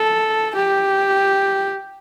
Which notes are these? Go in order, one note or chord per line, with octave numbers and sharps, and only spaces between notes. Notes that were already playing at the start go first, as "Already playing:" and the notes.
Already playing: A4
G4